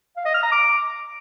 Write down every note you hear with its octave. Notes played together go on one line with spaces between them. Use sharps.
F5
D#5
F6
A#5
D6